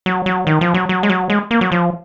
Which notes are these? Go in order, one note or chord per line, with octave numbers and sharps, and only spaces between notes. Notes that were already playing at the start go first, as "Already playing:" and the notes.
F#3
F#3
D#3
F3
F#3
F#3
G#3
F#3
G#3
A#3
F#3
F3